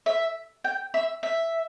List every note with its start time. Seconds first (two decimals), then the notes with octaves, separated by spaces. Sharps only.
0.06 E5
0.64 G5
0.94 E5
1.23 E5